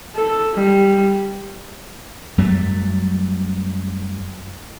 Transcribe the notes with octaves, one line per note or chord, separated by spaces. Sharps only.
A4
G3
F#2 F#3 G3 A3